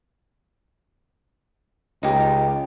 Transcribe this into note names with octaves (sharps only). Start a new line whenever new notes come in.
C#2 D#4 G4